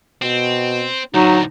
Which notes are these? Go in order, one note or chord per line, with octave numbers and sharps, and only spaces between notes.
B2 C4
D2 A2 F#3 D#4